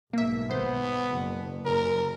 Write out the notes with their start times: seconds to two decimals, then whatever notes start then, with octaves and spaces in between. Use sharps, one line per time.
0.13 B1 G#2 A#3 E5
0.50 G#1 B3 C5
1.11 F#1
1.66 F#1 A#4